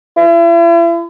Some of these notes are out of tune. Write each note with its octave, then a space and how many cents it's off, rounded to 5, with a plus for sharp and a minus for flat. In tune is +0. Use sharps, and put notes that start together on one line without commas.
E4 +40